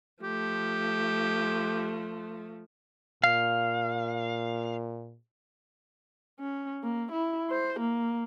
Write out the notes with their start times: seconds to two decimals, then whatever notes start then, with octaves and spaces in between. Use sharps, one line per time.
0.23 F3 A3 G4
3.24 A#2 F5
6.40 C#4
6.84 A#3
7.12 E4
7.50 C5
7.80 A#3